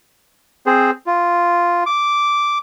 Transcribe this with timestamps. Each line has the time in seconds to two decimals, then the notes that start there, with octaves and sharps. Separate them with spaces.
0.66 C4 G#4 C5
1.06 F4
1.86 D6